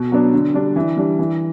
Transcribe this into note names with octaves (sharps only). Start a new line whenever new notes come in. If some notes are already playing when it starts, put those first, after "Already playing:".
Already playing: B2
F#3 B3 D4
D3
G3 D4
E3
G3 D4
E3